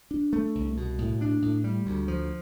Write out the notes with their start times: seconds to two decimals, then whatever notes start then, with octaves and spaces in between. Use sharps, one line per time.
0.11 D4
0.33 A3
0.55 C2
0.77 B2
0.98 A2
1.21 D4
1.42 A2
1.64 G3
1.86 D2
2.08 F3